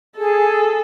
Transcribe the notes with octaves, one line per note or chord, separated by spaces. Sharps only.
G#4 A4